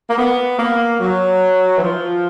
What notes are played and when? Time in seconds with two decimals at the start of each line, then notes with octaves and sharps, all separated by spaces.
0.10 A#3
0.17 B3
0.58 A#3
0.99 F#3
1.77 E3
1.83 F3